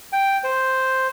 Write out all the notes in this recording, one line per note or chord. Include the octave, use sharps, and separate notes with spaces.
G5
C5